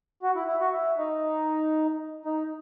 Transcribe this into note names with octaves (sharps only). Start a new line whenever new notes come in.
F#4
E4
E4
F#4
E4
D#4
D#4